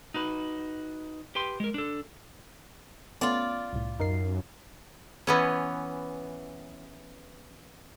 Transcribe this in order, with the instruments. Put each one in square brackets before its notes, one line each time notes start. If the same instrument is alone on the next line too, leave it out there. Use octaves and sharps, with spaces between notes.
[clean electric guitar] D#4 F#4 B4
G4 B4 G5 C6
G#3 A#4
D4 A4
[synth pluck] A3 B3 C#4 [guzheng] F4 D5
[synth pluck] C2 A2
[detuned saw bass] F#2 [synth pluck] D#4 A#4 C7
[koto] E3 B3 C#4